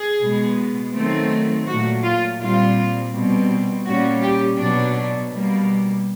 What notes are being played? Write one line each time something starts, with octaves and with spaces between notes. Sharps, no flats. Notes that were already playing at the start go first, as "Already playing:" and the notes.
Already playing: G#4
B2 G#3 B3
D#3 F#3 A3 C4
A#2 F#3 A3 F#4
F4
A#2 G3 C4 F4
B2 G3 C4
A#2 G3 A#3 C#4 F#4
G4
B2 F#3 B3 D4
B2 G3 A#3